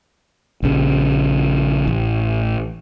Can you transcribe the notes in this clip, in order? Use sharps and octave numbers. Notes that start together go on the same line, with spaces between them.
A#1 C#3
A1